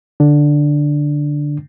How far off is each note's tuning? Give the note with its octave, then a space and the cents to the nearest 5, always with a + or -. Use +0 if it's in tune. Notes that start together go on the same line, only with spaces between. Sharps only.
D3 +0 D4 +0